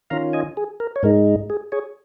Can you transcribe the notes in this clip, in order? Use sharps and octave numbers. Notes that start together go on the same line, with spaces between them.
D#3 C#4 F4 F5 A#5
D#5 G#5
G#4
A#4
C#5
G#2 G#3 D#4 A#4
G#4
G#4 C#5